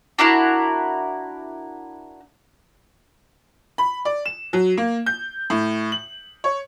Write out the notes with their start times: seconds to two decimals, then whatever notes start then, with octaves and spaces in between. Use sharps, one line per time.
0.18 D4 E4 F#4 A#4
3.78 B5
4.05 D5
4.26 E7
4.53 F#3
4.77 A#3
5.06 G6
5.50 A2
5.92 F#7
6.44 C#5